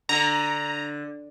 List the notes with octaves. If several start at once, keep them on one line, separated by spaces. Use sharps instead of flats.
D3 A#5